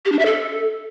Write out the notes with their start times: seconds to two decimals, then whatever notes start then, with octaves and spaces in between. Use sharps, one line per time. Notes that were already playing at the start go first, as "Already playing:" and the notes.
0.05 G4
0.12 D4
0.19 E5
0.26 A4